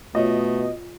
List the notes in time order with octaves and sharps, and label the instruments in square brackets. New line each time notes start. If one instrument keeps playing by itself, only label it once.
[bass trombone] B2 [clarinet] A3 [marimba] F4 C#5 [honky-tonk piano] D#5